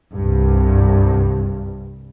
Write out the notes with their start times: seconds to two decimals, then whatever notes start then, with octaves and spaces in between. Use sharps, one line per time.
0.13 C2 G2